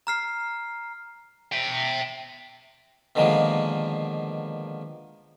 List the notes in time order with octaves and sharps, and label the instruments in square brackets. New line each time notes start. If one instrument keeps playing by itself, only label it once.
[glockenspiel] A#5 F6 C7
[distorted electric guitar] E5 G5
[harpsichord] B2 D3 D#3 F3 G#3 A#3